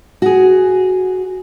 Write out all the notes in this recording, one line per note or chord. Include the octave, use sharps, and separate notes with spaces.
F#4 G#4